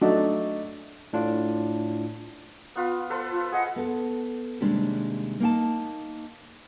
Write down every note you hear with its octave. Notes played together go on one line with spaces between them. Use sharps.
F#3 A3 D4 D#4 F#4
A2 D4 F4
B3 F4 B4
A4 B4 C5
F4
G#4 D#5 F#5
B3 A4
D#2 C3 G3 G#3 D4
A#3 D#4 G5 A5